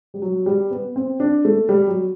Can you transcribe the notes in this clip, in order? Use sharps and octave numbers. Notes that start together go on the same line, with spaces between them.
G3
F#3
G3
B3
C4
D4
A3
G3
F#3